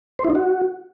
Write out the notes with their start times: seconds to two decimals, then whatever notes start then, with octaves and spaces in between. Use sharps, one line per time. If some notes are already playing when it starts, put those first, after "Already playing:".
0.19 C5
0.24 E4
0.30 D#4
0.35 F#4